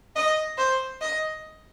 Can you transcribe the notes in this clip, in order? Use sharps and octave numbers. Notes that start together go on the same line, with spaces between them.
D#5
C5
D#5